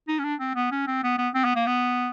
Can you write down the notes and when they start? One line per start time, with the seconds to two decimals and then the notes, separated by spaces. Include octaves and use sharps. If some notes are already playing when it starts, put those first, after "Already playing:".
0.08 D#4
0.19 C#4
0.24 D4
0.40 C4
0.55 B3
0.72 C#4
0.87 C4
1.04 B3
1.18 B3
1.34 C4
1.45 B3
1.56 A#3
1.67 B3